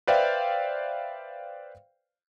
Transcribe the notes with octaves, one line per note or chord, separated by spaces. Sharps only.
B4 C5 D5 E5 F5 G5